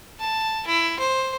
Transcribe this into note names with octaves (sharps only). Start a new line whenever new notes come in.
A5
E4
C5